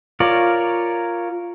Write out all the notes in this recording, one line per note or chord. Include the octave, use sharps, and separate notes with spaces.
F4 A#4 C#5 D5